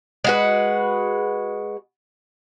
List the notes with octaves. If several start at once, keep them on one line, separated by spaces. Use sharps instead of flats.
G#3 F#4 B4